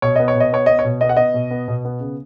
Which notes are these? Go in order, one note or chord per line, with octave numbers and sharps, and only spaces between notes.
B2 C#5
B3 D#5
C#5
B2
D#5
B3 C#5
B3 D#5
C#5
B2
B3 D#5
F#5
B3 D#5
B2
B3
B2
B3
C#3